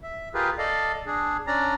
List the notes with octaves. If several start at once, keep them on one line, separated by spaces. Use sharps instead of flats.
E5
F4 G4 G#4 A#4 B4
A4 D5 D#5 F5
D4 G#4
C#4 D4 D5 A#5